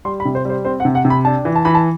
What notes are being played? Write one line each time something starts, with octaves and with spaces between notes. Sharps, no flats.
G3 C6
B5
C3
C5
G3 C5
C4 C5
F#5
C3
F#5
C3
B5
D4 A5
E3
A5
E3 B5
A5